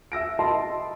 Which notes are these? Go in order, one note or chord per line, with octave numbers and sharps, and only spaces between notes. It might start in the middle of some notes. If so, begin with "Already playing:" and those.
E5 E6 A#6 D7
D#5 E5 A5 B5 C6